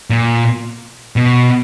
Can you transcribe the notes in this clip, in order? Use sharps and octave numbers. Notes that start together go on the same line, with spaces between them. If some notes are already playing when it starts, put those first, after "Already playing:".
A#2
B2